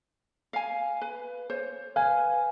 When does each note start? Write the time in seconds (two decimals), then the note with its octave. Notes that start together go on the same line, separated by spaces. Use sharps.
0.53 F5 G#5
1.02 B4
1.50 C5 C#5
1.96 B4 F5 G#5